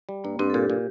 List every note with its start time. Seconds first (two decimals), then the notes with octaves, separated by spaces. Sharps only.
0.09 G3
0.24 G2 A#3
0.39 G2 C4
0.50 A4
0.54 A#2 G4
0.70 A#2